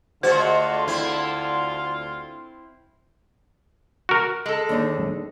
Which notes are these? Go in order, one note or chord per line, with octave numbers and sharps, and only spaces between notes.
D2 D3 G#3 F4 F#4 C5
C4 E4
F#4 A#4
G#3 A4
D#2 D4 D#4